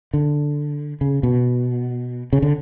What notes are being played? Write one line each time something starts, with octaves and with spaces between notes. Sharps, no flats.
D3
C#3
B2
C#3
D3